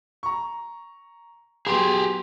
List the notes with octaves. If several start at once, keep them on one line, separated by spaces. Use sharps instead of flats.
A#5 C#6
F#3 B3 G4 G#4 C6